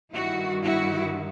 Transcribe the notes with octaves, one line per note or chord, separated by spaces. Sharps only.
G2 D#3 G3 E4 F#4
E4 F#4